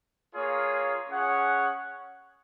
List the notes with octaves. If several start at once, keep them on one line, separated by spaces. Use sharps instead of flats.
A#3 F4 G#4 C#5 F5
C#4 G#4 C#5 F#5